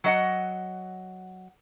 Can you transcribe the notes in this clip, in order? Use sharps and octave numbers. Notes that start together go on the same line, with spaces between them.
F#3 D#5 F#5